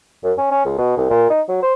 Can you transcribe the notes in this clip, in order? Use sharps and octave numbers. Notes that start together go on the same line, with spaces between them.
F#2
C#4
C#4
C#2
B2
C2
A#2
D#4
F#3
C5